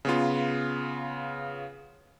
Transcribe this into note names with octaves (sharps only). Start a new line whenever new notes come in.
C#3 B3 F4